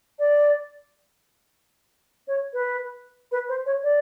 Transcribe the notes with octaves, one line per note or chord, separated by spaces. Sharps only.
D5
C#5
B4
B4
C5
C#5
D5